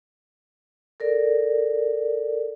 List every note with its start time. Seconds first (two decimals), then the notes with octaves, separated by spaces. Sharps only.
1.00 A4 A#4 D5